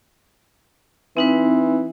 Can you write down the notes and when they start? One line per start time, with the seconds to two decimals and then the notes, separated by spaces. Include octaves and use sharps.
1.17 E3 C4 D#4 B4